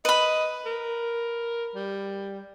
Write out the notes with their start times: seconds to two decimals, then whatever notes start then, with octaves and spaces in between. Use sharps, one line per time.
0.05 B4 D#5 B5
0.66 A#4
1.75 G3